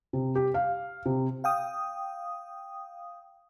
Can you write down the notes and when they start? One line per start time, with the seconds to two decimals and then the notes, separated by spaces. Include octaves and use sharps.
0.13 C3
0.35 G4
0.54 F5
1.06 C3
1.44 F5 G5 D#6